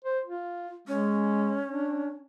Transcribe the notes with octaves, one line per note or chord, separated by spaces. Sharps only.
C5
F4
G#3 C#4
D4